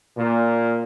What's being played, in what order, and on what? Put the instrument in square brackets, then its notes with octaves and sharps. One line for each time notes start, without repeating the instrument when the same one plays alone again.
[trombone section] A#2